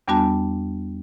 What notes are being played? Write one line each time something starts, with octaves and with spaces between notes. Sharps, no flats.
E2 G3 B3 D4 F#4 A5